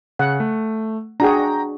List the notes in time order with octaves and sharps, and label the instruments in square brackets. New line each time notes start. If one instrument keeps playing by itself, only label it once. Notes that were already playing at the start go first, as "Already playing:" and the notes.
[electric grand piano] C#3 [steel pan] F#5
[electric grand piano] A3
[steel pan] D4 F#4 G#4 [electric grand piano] G5 A#5